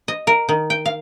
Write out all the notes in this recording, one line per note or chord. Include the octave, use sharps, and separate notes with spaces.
D#5
A#4
D#3
G5
F5